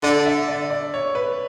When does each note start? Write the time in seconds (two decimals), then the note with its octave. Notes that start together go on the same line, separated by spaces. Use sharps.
0.03 D3 D5
0.26 E5
0.49 D5
0.70 D5
0.94 C#5
1.15 B4